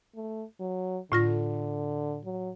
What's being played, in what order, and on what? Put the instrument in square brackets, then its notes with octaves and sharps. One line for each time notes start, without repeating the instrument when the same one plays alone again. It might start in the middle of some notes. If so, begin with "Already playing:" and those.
[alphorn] A3
F#3
[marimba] A2 F4 A#6 [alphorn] D3
[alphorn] F#3